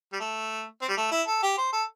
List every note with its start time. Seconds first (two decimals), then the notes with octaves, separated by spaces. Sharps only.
0.13 G3
0.20 A3
0.82 C4
0.88 G3
0.97 A3
1.11 E4
1.27 A4
1.43 G4
1.58 C5
1.73 A4